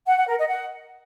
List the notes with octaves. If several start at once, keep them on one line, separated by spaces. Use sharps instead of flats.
F#5
F#5
A#4
D#5
F#5